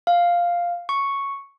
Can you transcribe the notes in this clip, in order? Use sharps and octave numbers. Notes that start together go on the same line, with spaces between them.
F5
C#6